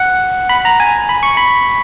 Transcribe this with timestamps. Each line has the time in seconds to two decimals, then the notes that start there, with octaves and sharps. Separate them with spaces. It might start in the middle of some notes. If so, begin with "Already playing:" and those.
Already playing: F#5
0.49 B5
0.65 A#5
0.80 G#5
1.09 B5
1.23 C#6
1.37 B5